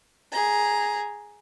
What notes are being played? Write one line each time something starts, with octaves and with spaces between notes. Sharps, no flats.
G#4 A#5